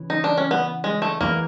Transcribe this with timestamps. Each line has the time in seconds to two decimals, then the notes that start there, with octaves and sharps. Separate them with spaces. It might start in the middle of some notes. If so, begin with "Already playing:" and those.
Already playing: C#3 E3
0.10 D#4
0.24 D4
0.38 C#4
0.51 B3
0.84 G#3
1.02 A3
1.21 E3 G#3 A#3 B3 E4